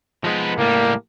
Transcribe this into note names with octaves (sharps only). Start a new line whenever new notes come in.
F3 G#3 B3 D#4 B4
C#2 A2 G3 A#3